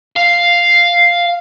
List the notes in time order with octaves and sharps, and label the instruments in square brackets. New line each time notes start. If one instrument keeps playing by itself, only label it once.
[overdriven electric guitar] F5